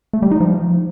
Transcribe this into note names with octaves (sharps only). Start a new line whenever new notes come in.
A3
G3
D#4
F3